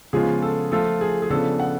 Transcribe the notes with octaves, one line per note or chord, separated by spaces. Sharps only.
C#3 F3 G#3 B3 F4 G#4
A4
F3 A3 F4 A4
G#4
G#4
C#3 F3 B3 D4 A4
F#5